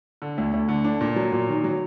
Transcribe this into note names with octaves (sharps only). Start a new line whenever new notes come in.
D3
D2
D2
D3
D4
A#2
F#3
A#2
D#3
F#3